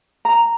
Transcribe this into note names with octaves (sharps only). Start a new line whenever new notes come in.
A#5